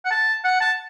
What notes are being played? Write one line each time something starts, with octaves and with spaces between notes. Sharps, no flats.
F#5
A5
F#5
A5